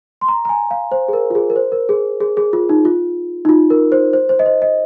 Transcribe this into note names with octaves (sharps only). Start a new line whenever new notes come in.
C6
A#5
A#5
G#5
F5
C5
G#4
A#4
F4
G#4
A#4
C5
A#4
G#4
G#4
G#4
F4
D#4
F4
D#4
F4
A#4
C5
C5
C5
D#5
C5
D#5